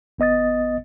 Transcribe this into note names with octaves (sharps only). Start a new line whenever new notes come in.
G1 B3 D#5 D#6 A6